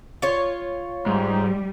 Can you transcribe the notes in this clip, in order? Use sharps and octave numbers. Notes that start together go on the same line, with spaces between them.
F4 C#5
G#2 G3